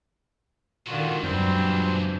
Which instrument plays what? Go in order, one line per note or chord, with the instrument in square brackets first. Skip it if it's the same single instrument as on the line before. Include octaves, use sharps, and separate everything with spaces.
[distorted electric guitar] C#2 A#2 [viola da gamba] D3 D#3 D4 [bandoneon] F4 F#4
[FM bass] F#2 [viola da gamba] E3 F#3 D4 [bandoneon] G3 C4 C5